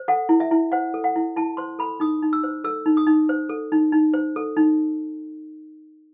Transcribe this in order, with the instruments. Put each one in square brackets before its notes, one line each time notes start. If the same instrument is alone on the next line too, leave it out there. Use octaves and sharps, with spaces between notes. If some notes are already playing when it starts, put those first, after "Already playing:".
Already playing: [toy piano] C5
A4 F#5
E4
E5
E4
C5 F#5
A4
F#5
E4
E4 A5
C5 C6
A4 B5
D#4 D#6
D#4
E6
C5
A4 E6
D#4
D#6
D#4
C5
A4
D#4
D#4
C5
A4
D#4